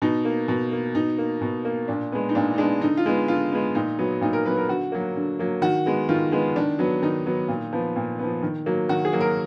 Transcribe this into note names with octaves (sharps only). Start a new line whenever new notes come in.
B2 D#4
A#3
B2
A#3
B2 D#4
A#3
B2
A#3
A#2 D4
G#3 B3
D#4
A#2 D4
D#4
G#3 B3 D4
D3 D#4
F4
G#3 B3
D3 F4
G#3 B3
A#2 D#4
F#3 B3
A#2 D#4
A#4
F#3 B3 B4
A#4
D3 F#4
F#3 A#3
D3
F#3 A#3
D#3 F#4
G#3 B3
D#3 F4
G#3 B3
D#3 D4
F#3 B3
D#3 D#4
F#3 B3
A#2
F3 B3
A#2
F3 B3
D#3
F#3 A#3
D#3 F#4
G#4
F#3 A#3
A#4